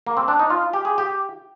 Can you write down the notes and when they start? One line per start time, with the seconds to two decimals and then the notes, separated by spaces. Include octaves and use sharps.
0.07 A#3
0.17 C4
0.28 D4
0.39 D#4
0.50 F4
0.73 G4
0.85 G#4
0.98 G4